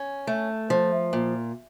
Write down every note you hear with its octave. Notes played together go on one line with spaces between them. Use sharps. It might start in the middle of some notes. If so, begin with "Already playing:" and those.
Already playing: C#4
A3
F3
A#2